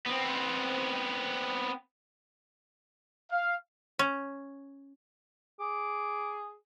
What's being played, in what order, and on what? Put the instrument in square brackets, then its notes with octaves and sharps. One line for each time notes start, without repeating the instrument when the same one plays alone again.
[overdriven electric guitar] B3 C4
[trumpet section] F5
[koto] C#4
[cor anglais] G#4 [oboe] D6